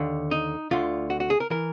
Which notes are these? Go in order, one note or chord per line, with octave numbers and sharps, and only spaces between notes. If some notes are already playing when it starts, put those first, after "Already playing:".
Already playing: D#2 D3
D#4
D2 D3 F4
F#4
F#4
G#4
A#4
E3 A#4